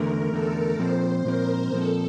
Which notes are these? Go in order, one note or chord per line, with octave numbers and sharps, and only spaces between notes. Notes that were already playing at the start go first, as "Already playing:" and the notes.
Already playing: E2 D3 A3 A#4
E2 D3 A3 A4
A#2 F3 C4 C5
A#2 F3 C4 A#4
A#2 F3 C4 A4